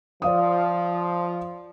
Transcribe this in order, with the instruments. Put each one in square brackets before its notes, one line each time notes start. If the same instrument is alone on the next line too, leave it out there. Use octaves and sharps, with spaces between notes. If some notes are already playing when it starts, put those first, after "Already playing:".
[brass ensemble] F3 [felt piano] D5 F5 D#6